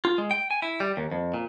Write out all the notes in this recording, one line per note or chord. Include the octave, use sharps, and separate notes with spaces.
F4
G#3
G5
G#5
E4
G3
D#2
F2
A#2